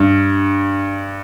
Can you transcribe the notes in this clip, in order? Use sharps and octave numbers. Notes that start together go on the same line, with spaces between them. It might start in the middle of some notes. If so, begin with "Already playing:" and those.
Already playing: G2